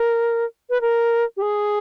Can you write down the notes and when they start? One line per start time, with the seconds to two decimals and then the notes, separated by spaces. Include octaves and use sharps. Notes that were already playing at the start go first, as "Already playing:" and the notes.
Already playing: A#4
0.70 B4
0.81 A#4
1.37 G4
1.42 G#4